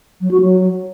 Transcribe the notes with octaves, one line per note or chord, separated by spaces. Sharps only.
F#3
F#4
F#3